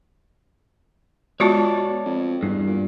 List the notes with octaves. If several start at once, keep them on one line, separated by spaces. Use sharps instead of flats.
B2 G#3 F4 F#4 C#5 D5 A5
F2
E2 G2
A#2